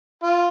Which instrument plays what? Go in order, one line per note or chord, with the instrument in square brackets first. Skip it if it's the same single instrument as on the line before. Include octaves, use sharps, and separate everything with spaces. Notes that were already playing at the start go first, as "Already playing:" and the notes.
[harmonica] F4